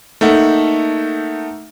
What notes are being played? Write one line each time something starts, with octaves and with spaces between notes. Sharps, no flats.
A3 A#3 D#4 A4 E5 F#5